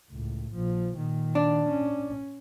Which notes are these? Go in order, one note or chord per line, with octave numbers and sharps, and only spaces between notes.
C#2 A2
A#1 F3
A#2 D#3
D4
C#4